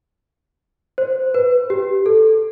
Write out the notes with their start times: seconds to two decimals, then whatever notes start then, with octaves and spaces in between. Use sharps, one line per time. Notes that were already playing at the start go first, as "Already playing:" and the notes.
0.98 C5
1.34 B4
1.70 G4
2.06 A4